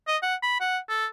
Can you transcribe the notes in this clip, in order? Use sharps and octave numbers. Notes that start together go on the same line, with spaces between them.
D#5
F#5
B5
F#5
A4